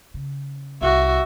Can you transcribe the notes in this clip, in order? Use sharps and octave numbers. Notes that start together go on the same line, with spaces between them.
C#3
C2 F#4 E5